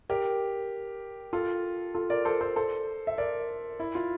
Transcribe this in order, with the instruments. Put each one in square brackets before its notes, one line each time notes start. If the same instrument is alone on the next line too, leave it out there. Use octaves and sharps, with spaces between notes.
[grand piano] G4 A#4
F4 A4
F4 A4
A#4 D5
A4 C5
A4 C5
A4 C5
E5
A#4 D5
E4
F4